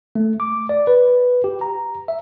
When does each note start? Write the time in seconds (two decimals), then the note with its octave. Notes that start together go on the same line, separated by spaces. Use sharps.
0.15 A3
0.40 D6
0.69 D5
0.87 B4
1.44 G4
1.61 A#5
2.08 E5